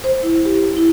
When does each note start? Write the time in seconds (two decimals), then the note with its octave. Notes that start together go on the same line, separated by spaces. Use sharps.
0.04 C5
0.23 E4
0.46 G4
0.77 E4